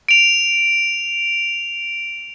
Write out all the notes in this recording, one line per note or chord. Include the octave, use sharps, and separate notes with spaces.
D7 F7